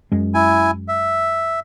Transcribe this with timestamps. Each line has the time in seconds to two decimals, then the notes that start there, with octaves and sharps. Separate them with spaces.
0.12 F#2 G#3
0.34 E4 G#5
0.88 E5